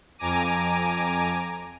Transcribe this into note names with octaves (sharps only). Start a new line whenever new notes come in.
F2 G#5 A#5 D6 D#7